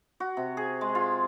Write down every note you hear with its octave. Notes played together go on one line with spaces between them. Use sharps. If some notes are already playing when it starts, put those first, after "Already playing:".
F#4
C3
G#4
G#3
F4